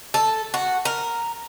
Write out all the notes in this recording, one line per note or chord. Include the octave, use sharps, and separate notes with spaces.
A4
F#4
A#4